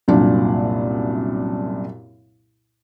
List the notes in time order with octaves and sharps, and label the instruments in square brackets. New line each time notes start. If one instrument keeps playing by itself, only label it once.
[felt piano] C2 F#2 A#2 D4